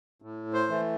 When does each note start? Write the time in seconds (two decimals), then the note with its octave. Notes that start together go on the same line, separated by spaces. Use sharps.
0.22 A2
0.53 C5
0.69 E3 A3